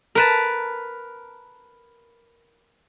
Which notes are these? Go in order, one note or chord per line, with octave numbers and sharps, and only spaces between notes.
A#4 B4 A5